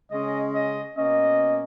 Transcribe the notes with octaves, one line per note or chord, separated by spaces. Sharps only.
C#3 G#3 C#4 D#5
D#5
B2 A#3 C#4 D#5